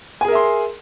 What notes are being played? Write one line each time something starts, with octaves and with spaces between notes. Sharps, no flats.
G#4 A#4 E5 G#5 C6